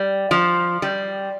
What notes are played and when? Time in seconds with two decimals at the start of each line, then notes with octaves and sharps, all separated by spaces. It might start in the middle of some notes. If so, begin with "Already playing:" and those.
Already playing: G3
0.31 F3
0.82 G3